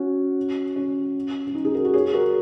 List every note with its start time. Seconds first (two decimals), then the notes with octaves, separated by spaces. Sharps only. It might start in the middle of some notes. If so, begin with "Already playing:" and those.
Already playing: C#4 F#4
0.76 C#4
1.47 C#4
1.54 D#4
1.65 D#4 G#4
1.74 F#4 A#4
1.84 F#4 A#4
1.94 G#4 C#5
2.13 F#4 A#4